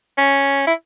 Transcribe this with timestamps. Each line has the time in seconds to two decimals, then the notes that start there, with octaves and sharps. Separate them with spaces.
0.18 C#4
0.67 E4